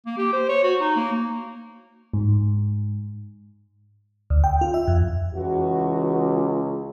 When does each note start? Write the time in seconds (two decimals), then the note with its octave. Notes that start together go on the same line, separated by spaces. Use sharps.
0.06 A#3
0.18 G4
0.33 C5
0.49 C#5
0.63 F#4
0.81 D#4
0.96 A#3
2.14 G#2
4.30 D2
4.44 G5
4.61 F4
4.74 E5
4.88 F2
5.35 C#2 E3 F#4